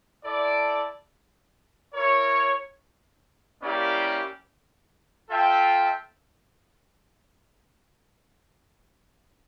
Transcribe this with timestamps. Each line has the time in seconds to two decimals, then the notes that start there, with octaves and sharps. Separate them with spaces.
0.24 E4 A4 D5
1.92 E4 A#4 C#5
3.61 A#3 C#4 E4 G4 D5
5.29 F4 A4 E5 G5